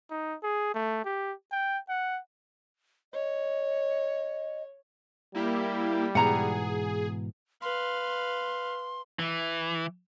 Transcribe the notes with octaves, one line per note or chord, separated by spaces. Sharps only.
D#4
G#4
A3
G4
G5
F#5
C#5 D#5
G3 A#3 E4 G4
G#2 B2 E3 G#4 F#5 A#5
B4 F5 C6
E3